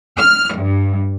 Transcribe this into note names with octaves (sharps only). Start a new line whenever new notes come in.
F6
G2